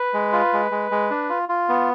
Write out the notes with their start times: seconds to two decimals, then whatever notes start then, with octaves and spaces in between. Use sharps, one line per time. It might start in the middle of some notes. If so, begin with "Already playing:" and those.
Already playing: B4
0.13 G#3
0.33 F4
0.53 G#3
0.71 G#3
0.91 G#3
1.10 D4
1.29 F4
1.49 F4
1.69 B3